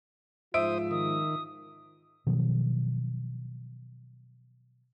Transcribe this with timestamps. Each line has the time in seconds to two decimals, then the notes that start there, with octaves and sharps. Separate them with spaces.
0.54 G#2 F3 F4 C5 E5 D#6 D7
0.91 D#3 D#6
2.27 B2 D#3 F3 F#3